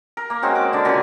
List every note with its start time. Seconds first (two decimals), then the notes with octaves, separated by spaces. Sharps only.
0.17 A#4
0.30 A#3
0.42 G#3 C4 C#4 F#4
0.55 D6
0.73 D3 D5
0.85 A#2 C#3 F#4 G#5